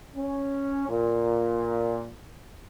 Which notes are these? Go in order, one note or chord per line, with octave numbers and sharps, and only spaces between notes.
C#4
A#2